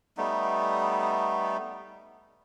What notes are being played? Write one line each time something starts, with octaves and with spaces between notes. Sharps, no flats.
G3 A3 B3 D#4